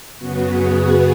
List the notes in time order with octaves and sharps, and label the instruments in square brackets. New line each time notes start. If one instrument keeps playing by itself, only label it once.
[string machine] F#2 C#3 B3 F#4
G#4
B3 B4